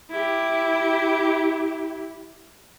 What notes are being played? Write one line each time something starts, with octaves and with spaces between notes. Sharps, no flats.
E4 G4